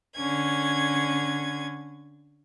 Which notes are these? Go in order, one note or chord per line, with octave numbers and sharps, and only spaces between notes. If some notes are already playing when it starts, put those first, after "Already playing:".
D3 C#4 G#6